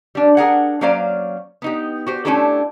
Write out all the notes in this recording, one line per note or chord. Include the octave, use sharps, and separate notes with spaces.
G3 D4
D4 G#4 A#4 F#5
F#3 A#3 C#4 C5 D5 F5
B3 D#4 G4
F#4 G4 C5
A3 C#4 D4 E4 G4 A4